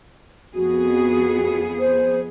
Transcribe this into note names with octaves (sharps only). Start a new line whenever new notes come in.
F2 B3 F#4 G#4
C5